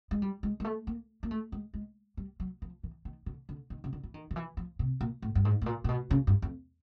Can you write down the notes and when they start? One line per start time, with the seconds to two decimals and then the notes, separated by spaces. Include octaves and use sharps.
0.11 G#3
0.22 G3
0.43 G#3
0.60 G#3
0.65 A3
0.87 A#3
1.23 A#3
1.31 A3
1.52 G#3
1.74 G#3
2.17 G3
2.40 F#3
2.62 F3
2.83 E3
3.05 D#3
3.26 D3
3.49 D3
3.70 D#3
3.84 C#3
3.93 D3
4.03 E3
4.14 D#3
4.31 D#3
4.36 E3
4.57 F3
4.79 C3
5.01 A#2
5.22 A2
5.35 G2
5.45 G#2
5.62 A2
5.66 A#2
5.84 A#2
5.89 B2
6.11 C#3
6.27 G2
6.42 F2